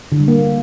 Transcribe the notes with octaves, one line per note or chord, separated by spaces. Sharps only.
D3
G3
A#3